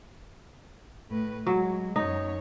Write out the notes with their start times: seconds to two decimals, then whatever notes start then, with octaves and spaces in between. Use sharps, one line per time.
1.10 A2 B4
1.47 F#3 G#3
1.96 F#2 D#4 C#5